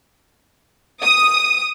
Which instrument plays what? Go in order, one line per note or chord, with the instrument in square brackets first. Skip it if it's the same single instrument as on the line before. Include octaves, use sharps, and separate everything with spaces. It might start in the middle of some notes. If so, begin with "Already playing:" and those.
[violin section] D#6